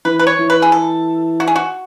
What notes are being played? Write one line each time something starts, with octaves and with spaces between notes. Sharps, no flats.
E3 B4
B4
C#5
E3
B4
G#4
A4
F#4
G#4
F#4